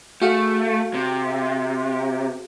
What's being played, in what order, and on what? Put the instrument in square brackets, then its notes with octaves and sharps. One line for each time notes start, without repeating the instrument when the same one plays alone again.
[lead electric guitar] A3 [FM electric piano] F#4 G#4 F5
[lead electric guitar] C3